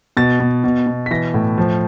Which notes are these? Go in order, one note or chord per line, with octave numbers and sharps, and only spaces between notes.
B2 A6
B2
B2
B2
B6
E3 A#6
A2
F3